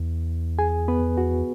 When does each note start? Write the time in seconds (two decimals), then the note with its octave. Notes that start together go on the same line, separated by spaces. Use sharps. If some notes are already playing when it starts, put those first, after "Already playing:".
Already playing: E2
0.59 G#4 G#5
0.88 B3 B4
1.18 F#4